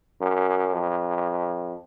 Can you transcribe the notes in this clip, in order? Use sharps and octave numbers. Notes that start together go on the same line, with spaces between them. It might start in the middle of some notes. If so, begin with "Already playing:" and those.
F#2
F2